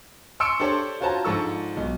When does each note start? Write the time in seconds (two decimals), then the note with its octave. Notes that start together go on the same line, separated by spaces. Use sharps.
0.40 G#5 C6 C#6 E6 C#7 D7
0.60 D4 G4 A4 C5 C#5 C6
1.01 F4 F#4 C5 C#5 A5 A#5
1.25 G#2 F3 D4 A4 C#6 E6
1.77 B1